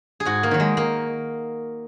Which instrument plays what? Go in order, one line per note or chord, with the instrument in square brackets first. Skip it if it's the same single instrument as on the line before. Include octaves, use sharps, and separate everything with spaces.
[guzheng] G#4
G#2 F#4
A#3
D#3 F#3
G#3
A#3